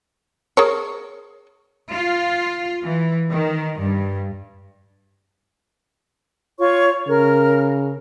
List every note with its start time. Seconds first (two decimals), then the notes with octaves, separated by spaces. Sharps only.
0.57 G#4 A#4 C#5
1.91 F4
2.84 E3
3.31 D#3
3.80 G2
6.59 F4 C#5 C#6
7.08 C#3 A#4 F6